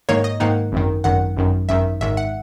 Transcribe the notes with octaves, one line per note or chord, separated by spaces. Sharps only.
G#2 D#3 A#3 D#4 C#5
D#5
G#2 D#3 A#3 D#4 F#5
G#1 F#2 D#3
G#1 F#2 D#3 F#5
G#1 F#2 D#3
G#1 F#2 D#3 E5
G#1 G#2 D#3 E5
F#5